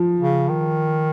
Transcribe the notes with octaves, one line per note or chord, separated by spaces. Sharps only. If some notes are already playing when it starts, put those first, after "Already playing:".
Already playing: F3
C#3
D#3